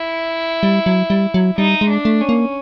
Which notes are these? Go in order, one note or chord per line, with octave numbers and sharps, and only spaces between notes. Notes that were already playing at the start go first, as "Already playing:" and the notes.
Already playing: E4
G3
F#3
G3
F#3
G3 D#4
G#3
D4
A3
C#4
A#3